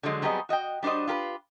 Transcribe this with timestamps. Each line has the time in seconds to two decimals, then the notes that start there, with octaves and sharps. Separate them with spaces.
0.03 D3 F3 F#3 G#3
0.22 F#3 G3 B3 C4 G#4 D#5
0.49 F#4 D#5 F#5 G5
0.83 G3 D4 F#4 C5 D#5
1.07 F4 G4 A#4 B4